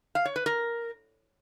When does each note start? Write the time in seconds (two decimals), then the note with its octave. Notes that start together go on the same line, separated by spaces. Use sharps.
0.15 F5
0.25 C#5
0.36 B4
0.46 A#4